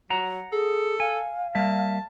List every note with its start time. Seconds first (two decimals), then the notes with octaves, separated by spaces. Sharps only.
0.10 F#3 F#5 A#5
0.52 G#4 A4
1.00 F5 G#5
1.55 G3 A#3 E5 A5